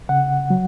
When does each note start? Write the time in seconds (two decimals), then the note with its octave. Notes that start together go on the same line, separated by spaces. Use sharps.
0.09 C#3 F#5
0.50 F#3